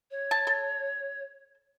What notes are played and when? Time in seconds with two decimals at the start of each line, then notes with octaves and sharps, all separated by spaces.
0.11 C#5
0.31 A5
0.47 A4